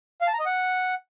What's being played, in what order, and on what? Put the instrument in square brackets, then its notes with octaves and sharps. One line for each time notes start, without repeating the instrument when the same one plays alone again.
[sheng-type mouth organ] F5
A5
A#5
D#5
F#5